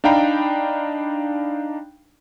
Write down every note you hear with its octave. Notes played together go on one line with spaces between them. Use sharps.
D4 D#4 F5 G5 A#5 B5